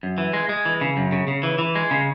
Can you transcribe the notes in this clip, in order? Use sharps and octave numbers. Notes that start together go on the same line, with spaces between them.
F#2
E3
G#3
G#3
E3
C#3
F#2
C#3
C#3
E3
E3
G#3
C#3